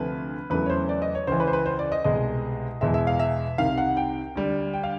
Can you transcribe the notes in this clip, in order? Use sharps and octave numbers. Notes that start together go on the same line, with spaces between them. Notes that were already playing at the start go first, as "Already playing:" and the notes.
Already playing: D2 C3 F3 A3 B4
E2 C#3 F#3 A3 B4
C#5
C5
D5
D#5
C#5
C#2 C#3 E3 C5
B4
C5
B4
C5
D5
D#5
C2 B2 G#3 D#5
E2 B2 G#3 E5
E5
F5
E5
C2 C3 D#3 F5
F#5
G5
D2 D3 G3
G5
F5